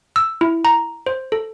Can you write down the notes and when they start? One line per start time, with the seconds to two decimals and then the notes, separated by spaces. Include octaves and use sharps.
0.16 E6
0.41 E4
0.65 A#5
1.06 C5
1.32 A4